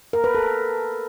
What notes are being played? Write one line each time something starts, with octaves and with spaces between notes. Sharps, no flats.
A#4
B4
A4